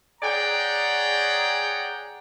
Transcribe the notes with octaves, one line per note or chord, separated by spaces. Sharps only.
G#4 C#5 D5 F#5 G5 A#5